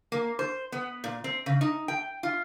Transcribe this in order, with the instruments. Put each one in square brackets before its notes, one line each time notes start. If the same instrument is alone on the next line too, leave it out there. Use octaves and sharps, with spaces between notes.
[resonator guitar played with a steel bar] A#3
C5
B3
A#2
C4
C#3
D#4
G5
F4